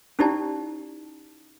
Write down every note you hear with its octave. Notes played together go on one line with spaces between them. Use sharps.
C#4 D#4 E4 G4 D5 A5